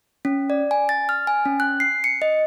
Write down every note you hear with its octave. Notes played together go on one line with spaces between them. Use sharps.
C#4
D5
G#5
A6
F6
G#5
C#4
F#6
C7
C#7
D#5